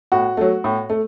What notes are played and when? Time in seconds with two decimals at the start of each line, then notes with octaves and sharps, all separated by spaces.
0.12 A2 F#4
0.37 F#3 A3
0.64 A2
0.90 A3